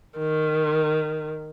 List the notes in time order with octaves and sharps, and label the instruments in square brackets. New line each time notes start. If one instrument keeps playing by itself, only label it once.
[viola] D#3